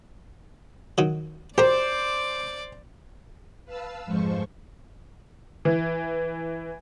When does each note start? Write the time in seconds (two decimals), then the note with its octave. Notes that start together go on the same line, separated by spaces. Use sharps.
0.98 D#3 F#3
1.58 G4 A#4 C5 D5 D6
3.65 B4 F5 A5 E6
4.06 F2 G#2 F3 G#3 C5 C#6
5.65 E3